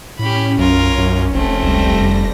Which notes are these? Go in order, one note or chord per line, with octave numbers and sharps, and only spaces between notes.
A2 C#4 G4 B5
B1 F#2 F4 A#4
F#2
F1 A3 C4
C#2 G3 A#6
F2